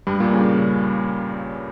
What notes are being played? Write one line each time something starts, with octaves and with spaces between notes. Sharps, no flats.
G2 G3
A#2 A#3
C#3 C#4